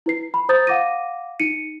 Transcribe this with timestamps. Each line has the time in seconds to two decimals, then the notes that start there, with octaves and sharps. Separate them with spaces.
0.06 E4 B4 C7
0.34 B5
0.49 C5 A#5 D#6 G6 A6
0.67 F5 F#5 D6 A#6 D#7
1.40 D#4 C#7 D#7